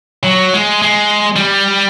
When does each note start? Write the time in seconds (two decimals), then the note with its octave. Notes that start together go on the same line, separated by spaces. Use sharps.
0.24 F#3
0.54 G#3
0.82 G#3
1.36 G3